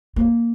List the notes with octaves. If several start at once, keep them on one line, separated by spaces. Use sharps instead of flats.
A#3